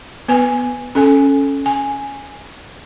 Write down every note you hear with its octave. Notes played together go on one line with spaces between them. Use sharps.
B3 B4 G#5
C#4 A4 G#5
G#5